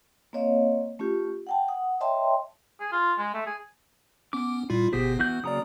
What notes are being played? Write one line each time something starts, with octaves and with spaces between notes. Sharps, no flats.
A#3 C4 C#5 D#5 F5
A3 C#4 F4 G4
F#5 G5 A5
F#5 D#6
C#5 D#5 E5 G5 A5 C6
G#4
F4
G#3
A3
G#4
B3 C#4 D6
A#2 G3 E4 F4
G1 B2 B3 G4 G#4 C5
E3 B3 F#4 G6
C#3 F#3 A#3 D5 A#5 D#6